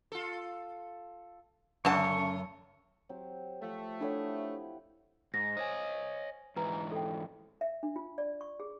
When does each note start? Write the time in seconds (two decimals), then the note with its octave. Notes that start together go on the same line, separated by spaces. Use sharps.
0.12 F4 A4
1.85 F#2 C#3 G#3 A3 D4 F#5 A5 C#6
3.09 F#3 C4 G4
3.62 F3 A3
4.01 D4 E4 G4 A4 C#5 F#5
5.34 G#2 A#6
5.57 C5 C#5 D#5 G#5
6.56 G#2 E3 B4 A#5
6.92 A4 G5
7.61 E5
7.83 D4
7.96 F4
8.18 D5
8.41 C#6
8.60 G#4